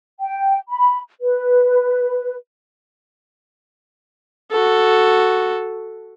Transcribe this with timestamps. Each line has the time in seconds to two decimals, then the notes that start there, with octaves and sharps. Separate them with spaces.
0.19 G5
0.68 B5
1.19 B4
4.51 F#4 A4